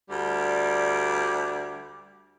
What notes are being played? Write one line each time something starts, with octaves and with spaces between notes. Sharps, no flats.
D2 G3